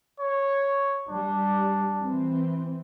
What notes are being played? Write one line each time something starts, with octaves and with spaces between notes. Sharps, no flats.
C#5
G3 D4
E3 C4